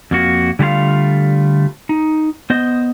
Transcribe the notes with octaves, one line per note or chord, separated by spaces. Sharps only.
F2 A#3 F#4
D3 G3 A3 F4 F5
D#4
B3 C5 D#5